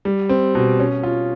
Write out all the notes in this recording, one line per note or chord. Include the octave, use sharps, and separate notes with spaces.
G3
C4
B2
C#4
F4